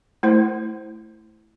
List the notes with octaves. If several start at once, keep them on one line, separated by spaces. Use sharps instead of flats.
A3 E4 C5